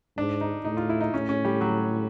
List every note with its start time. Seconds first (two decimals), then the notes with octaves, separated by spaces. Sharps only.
0.17 G#2 D4
0.41 D#4
0.65 A2 D#4
0.77 F4
0.89 E4
1.01 D#4
1.13 A2 C#4
1.29 C#4
1.44 G3
1.61 F#3